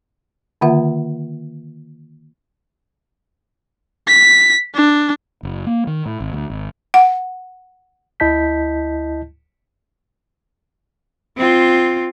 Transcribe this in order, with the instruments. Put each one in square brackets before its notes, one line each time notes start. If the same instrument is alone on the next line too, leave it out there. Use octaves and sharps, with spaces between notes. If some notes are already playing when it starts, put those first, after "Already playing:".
[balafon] D3 D#3 A#3 F4 E5 F#5
[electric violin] B6
D4
[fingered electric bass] F#1
A#3
D#3
A2
G#1
D2
G#1
[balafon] F#5
[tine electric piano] D2 E4 D#5 A5 G6 B6
[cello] C4 F4